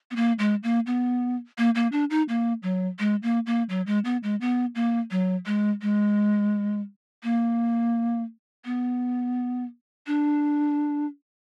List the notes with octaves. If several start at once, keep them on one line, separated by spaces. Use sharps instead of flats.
B3
A#3
G#3
A#3
B3
A#3
A#3
D4
D#4
A#3
F#3
G#3
A#3
A#3
F#3
G#3
B3
G#3
B3
A#3
F#3
G#3
G#3
A#3
B3
D4